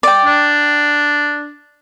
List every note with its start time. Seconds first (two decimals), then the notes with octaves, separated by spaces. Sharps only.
0.03 D5 G5
0.25 D4